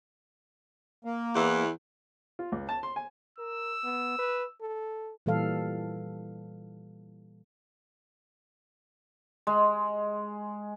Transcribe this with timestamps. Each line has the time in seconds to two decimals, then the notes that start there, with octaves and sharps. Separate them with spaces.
1.05 A#3
1.36 E2 E3
2.39 F4
2.52 C#2
2.69 A5
2.83 C6
2.96 G#5
3.38 A#4 E6
3.84 B3
4.19 B4
4.61 A4
5.26 A#2 E3 G3 A4 F5
9.47 G#3